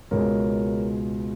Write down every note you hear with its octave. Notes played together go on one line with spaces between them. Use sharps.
C#2 B2 G#3 A#4 C#5